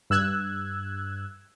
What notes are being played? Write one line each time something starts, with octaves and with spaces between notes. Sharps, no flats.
G2 E6 F#6 G#6